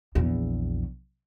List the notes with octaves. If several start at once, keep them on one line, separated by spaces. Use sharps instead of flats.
A#1 E2